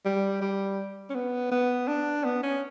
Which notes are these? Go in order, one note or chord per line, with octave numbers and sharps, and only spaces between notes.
G3
G3
C#4
B3
B3
D4
B3
C#4